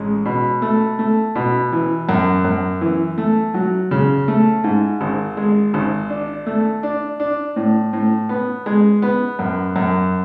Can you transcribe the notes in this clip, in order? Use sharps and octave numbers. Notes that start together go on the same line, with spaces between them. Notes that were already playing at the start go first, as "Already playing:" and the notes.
Already playing: A1 G#3
B2
A3
A3
B2
E3
F#2
F#2
E3
A3
F#3
C#3
A3
G#2
G#1
G#3
G#1
D4
A3
D4
D4
A2
A2
B3
G#3
B3
F#2
F#2